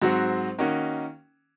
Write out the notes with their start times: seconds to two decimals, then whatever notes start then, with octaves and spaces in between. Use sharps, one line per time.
0.02 G#2 F#3 C4 F#4
0.58 D#3 A#3 C#4 F#4